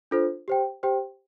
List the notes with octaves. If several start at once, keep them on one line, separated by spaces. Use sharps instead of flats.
D4 F4 A4 C5
G4 C5 G5
G4 C5 G5